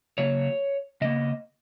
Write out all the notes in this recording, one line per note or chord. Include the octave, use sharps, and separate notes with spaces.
C#3 F#3 A#3 C#5
C#3 A#3 D#5